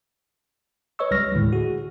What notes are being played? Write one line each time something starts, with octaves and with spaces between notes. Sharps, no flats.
B4 C#5 D#5 C#6 E6
C#2 G3 F6 A#6
D#2 A2 D3 D#3 G#3
F#4 G#4